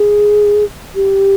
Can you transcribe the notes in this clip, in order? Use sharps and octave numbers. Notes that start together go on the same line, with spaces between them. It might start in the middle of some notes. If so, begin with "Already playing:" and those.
Already playing: G#4
G4